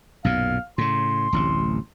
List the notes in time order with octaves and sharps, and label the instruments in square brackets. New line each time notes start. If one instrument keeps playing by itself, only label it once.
[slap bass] B1 F#2 A#2 [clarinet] F5
[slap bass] A2 C#3 [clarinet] C6
[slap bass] D1 A1 C3